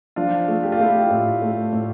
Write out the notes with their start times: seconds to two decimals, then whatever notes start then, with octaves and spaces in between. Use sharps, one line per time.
0.16 F3 D4 F4
0.48 A3
0.63 G4
0.72 F4
0.79 A3 E4 G4
1.10 A2
1.42 A3
1.73 A2